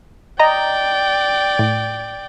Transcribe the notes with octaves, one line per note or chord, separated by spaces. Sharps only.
D5 D#5 G5 A#5
A2